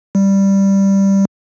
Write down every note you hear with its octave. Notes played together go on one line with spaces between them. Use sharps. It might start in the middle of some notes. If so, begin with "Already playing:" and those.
G3